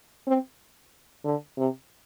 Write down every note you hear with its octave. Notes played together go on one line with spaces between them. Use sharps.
C4
D3
C3